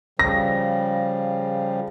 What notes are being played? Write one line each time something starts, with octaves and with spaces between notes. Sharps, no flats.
C#3 F3 G3 A#6